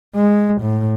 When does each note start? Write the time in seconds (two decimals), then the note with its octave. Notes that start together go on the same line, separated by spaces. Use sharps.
0.16 G#3
0.62 A2